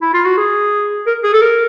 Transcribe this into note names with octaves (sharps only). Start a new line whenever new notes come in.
E4
F4
F#4
G#4
A#4
G#4
A4
A#4